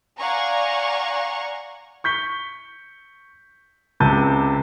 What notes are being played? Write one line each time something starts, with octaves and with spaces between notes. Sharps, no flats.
D5 F5 F#5 G#5 A#5 C#6
C#6 G6 B6 G7
C#2 C3 A5 G6 D#7